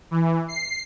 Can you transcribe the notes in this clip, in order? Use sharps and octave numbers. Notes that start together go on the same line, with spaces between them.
E3
C7